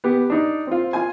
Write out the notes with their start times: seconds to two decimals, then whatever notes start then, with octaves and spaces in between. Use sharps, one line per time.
0.04 B3 G4
0.30 D4 D#4
0.67 C4 F4
0.93 F4 G#5